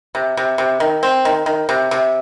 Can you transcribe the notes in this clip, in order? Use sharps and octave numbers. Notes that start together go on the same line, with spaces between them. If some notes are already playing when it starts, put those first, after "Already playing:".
C3
C3
C3
D#3
C4
D#3
D#3
C3
C3